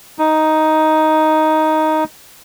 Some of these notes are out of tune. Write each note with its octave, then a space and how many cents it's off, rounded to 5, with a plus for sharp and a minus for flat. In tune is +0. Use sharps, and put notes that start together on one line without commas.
D#4 +5